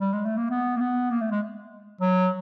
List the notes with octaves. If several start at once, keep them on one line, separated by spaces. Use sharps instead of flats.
G3
G#3
A3
A#3
B3
A#3
B3
A#3
A3
G#3
F#3